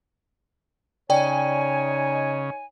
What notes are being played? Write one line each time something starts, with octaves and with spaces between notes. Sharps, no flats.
C#3 D#4 C#5 D5 G5 G#5